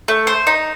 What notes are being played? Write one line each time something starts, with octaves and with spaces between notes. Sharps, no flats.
A3
C5
D#4